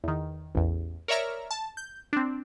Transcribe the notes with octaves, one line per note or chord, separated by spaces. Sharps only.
E2 D#3
A1 E2
A#4 C#5 D5 E5 A#5 F6
A5
G6
C4 D4